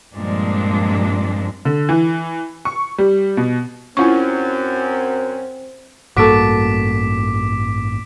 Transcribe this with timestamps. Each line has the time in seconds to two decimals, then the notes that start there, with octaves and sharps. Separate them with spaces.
0.15 G2 A#2 F3 G#3 C4 D4
1.65 D3
1.89 E3
2.65 C#6
2.98 G3
3.37 B2
3.97 F#2 C4 C#4 E4 F4 F#5 G#5 C#6
6.17 A1 G2 A#3 F#4 A4 D6 B6 D7